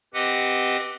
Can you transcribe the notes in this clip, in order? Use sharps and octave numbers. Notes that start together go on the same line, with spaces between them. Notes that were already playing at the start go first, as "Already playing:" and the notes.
C4 G4 B4 D#5 F#5